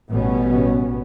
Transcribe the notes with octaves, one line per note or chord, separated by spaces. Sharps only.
A1 B2 G3 B3 C#4